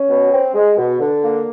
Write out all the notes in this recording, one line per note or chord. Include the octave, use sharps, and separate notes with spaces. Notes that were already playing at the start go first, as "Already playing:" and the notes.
Already playing: C#4
B2
C4
G#3
B2
D3
A#3